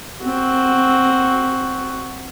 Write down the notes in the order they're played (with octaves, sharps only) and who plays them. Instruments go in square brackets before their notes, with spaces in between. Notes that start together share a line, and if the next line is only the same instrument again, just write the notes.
[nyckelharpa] C4 F#4